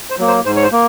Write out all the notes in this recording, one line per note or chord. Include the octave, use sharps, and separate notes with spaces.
C5
F#3 A#3
C5
G#2 C5
C#5
C5
A#3